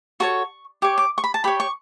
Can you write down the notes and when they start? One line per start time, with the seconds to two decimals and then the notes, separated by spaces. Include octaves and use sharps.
0.20 F#4 A4 C#5 C#6
0.82 G4 C#5 D6
0.98 D6
1.18 C#6
1.24 B5
1.34 A5
1.44 G4 C#5 B5
1.60 C#6